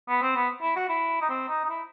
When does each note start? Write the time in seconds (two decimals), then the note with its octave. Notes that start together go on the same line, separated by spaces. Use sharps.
0.08 B3
0.22 C4
0.36 B3
0.62 E4
0.76 F#4
0.89 E4
1.21 D#4
1.30 C4
1.49 D#4
1.64 D#4
1.70 E4